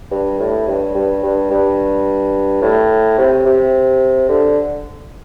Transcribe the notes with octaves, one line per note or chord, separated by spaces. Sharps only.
G2
A2
G2
G2
G2
G2
A2
C3
C3
D3